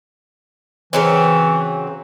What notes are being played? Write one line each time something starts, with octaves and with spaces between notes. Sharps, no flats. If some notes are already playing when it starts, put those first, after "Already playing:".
C#3 E3 F#3 C4